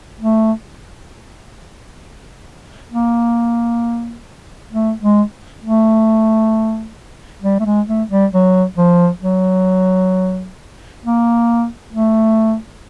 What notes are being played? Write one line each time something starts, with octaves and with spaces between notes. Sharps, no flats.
A3
A#3
A3
G#3
A3
G3
A3
G#3
A3
G3
F#3
F3
F#3
A#3
A3